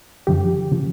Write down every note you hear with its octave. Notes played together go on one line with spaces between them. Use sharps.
F#2 D3 F3 G4
C#3 F3